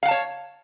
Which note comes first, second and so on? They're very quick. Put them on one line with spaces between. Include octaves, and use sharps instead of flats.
F5 F#5 A5 C#5